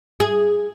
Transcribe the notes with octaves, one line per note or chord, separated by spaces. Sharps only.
G#4